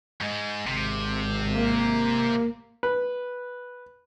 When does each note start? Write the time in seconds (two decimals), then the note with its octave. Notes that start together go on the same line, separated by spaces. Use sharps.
0.21 G#2 G#3
0.67 G#1 C3
1.55 A#3
2.83 B4